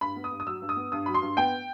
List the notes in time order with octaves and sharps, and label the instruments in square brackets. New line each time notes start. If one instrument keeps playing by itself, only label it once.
[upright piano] G2 B5
B3
D#6
G2
D#6
F#3 E6
G2
D#6
B3
G2 D#6
F#3 B5
C6
G2
B3 G5